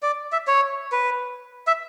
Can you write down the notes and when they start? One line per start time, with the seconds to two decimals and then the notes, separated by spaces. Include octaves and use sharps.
0.03 D5
0.32 E5
0.47 C#5
0.92 B4
1.67 E5